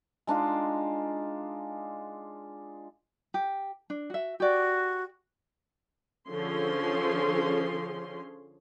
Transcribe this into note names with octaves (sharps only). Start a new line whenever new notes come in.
G#3 D4 D#4 F4
G4
D4
F#4 E5
F#4 G4 D5
D3 F3 C#4 G#4 C6